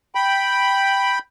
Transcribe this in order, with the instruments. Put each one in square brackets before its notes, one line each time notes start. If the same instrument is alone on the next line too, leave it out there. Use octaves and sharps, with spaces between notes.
[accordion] G5 B5